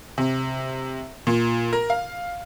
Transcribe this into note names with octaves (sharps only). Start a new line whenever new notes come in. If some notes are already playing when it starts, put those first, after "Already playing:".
C3
A#2
A#4
F5